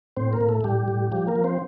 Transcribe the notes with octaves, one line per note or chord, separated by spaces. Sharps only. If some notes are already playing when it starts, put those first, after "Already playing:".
A2 C4 C5
A#3 A#4
A2
A3 A4
A4
A2 G3 G4
A2
F3 G3 G4
A#3 A#4
F3
C4 C5